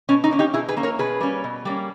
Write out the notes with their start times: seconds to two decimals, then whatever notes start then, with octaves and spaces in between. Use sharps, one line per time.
0.09 B2 C#4
0.24 D#4
0.31 A#3 C#4
0.39 D#4 G4
0.54 B2 E4 G#4
0.68 G#4 B4
0.77 A#3 C#4
0.83 A#4 C#5
0.99 B2 G#4 B4
1.20 G3 A#3 C#4
1.44 B2
1.65 G3 A#3 C#4